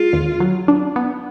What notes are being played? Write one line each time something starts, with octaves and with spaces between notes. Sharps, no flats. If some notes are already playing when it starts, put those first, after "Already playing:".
Already playing: G#3 F4
D#2
F#3
D4
B3